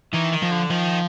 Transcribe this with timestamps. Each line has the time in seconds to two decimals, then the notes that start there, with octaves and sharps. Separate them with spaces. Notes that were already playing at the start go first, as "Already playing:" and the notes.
0.14 D#3 E3
0.33 D#3
0.43 F3
0.51 D3
0.70 D#3 F3